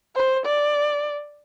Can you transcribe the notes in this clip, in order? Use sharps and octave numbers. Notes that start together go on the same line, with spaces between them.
C5
D5